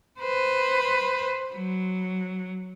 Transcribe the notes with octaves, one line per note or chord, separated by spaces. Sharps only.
B4 C5
F#3